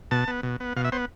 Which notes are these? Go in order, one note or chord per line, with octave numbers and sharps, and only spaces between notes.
B2 A5
B3
B2
B3
B2 F5
E5
B3 C5